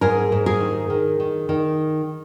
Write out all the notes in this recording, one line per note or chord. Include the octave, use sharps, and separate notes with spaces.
G#2 G#4 A#4
G#2
G#4 A#4
D#3
D#3
D#3
D#3